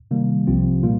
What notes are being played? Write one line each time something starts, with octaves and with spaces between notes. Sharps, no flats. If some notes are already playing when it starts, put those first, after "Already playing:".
C3 D#3 G3 A#3
C2 C3 F3 C4 F4
A#2 G3 A#3 F4